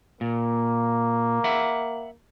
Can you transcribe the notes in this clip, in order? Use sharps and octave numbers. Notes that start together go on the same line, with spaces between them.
A#2 A#3
E5 F#5 B5